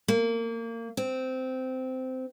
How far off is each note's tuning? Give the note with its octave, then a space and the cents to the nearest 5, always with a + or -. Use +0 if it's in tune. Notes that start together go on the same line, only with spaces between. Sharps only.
A#3 -25
C4 -15